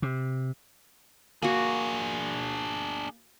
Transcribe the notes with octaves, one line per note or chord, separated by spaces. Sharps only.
C3
A#3 D4 F#4 G#4